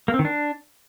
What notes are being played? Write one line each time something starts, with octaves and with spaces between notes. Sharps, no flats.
A#3
C4
D#3
D4